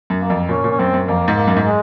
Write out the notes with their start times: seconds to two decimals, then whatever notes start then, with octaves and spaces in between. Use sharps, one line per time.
0.10 F#2
0.20 A#3
0.30 F2
0.49 A#2 C#4
0.64 A#2
0.71 C#4
0.79 F#2 C4
0.94 F#2
1.08 F2 A#3
1.28 G#2
1.37 A#3
1.47 F#2
1.57 G#2
1.66 G#3